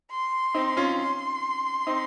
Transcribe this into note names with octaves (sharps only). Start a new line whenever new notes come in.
C6
C4 D#4
C#4 F4
C6
C4 D#4